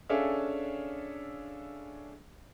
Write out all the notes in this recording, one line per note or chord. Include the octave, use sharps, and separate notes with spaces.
C#4 D4 G#4 A4 E5 F5